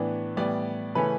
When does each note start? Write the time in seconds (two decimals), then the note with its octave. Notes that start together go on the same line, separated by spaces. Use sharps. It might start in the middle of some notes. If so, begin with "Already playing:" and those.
Already playing: A2 E3 B3 D4
0.36 A2 E3 G3 B3 D5
0.95 C#3 E3 A3 C#4 B4